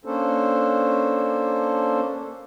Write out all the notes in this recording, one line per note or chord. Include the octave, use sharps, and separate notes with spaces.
A#3 C#4 D4 A4 C5